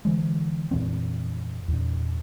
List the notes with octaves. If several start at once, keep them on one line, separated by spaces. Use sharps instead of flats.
D3 E3 G#3
F2 A#2 E3 C4
E2 A#2